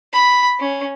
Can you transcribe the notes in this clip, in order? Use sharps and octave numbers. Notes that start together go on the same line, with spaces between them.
B5
C#4